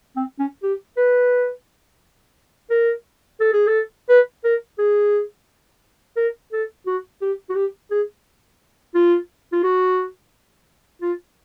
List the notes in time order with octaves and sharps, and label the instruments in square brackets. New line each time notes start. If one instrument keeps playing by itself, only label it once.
[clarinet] C4
C#4
G4
B4
A#4
A4
G#4
A4
B4
A#4
G#4
A#4
A4
F#4
G4
F#4
G4
G#4
F4
F4
F#4
F4